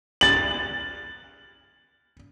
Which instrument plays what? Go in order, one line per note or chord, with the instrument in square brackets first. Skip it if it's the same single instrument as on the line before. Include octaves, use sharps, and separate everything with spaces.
[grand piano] A6 F#7